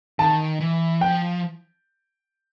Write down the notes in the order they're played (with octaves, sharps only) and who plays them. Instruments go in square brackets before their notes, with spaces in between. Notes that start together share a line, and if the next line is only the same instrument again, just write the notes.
[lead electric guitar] D#3 [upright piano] A5
[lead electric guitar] E3
[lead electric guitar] F3 [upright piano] G5